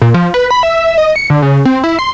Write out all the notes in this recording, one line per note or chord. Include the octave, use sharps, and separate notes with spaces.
A#2
F3
B4
B5
E5
D#5
C#7
D3
C#3
C4
E4
C6